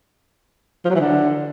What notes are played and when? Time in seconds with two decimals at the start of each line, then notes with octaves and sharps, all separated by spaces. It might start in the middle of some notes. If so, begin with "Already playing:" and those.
0.85 F3
0.90 F#3
0.95 E3
1.00 D3